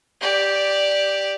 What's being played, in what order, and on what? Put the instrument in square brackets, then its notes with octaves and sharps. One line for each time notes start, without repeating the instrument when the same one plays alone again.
[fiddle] G4 D5